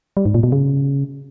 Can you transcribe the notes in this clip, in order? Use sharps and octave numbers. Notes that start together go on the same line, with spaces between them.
G3
G#2
A#2
B2
C#3